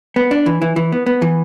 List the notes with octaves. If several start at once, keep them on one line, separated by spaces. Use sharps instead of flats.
B3
D4
E3
E3
E3
B3
B3
E3